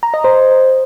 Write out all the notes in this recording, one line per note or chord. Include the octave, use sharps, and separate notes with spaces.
A#5
D#5
C5